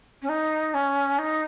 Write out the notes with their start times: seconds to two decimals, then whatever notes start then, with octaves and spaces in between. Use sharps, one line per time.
0.22 C#4
0.29 D#4
0.74 C#4
1.19 D#4